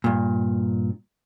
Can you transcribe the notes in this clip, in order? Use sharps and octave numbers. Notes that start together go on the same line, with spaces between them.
G2 A#2